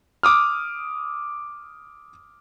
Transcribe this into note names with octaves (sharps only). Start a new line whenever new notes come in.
D6 D#6 F6